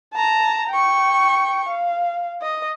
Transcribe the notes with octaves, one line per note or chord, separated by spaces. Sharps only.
A5 A#5
G5 C#6
F5
D#5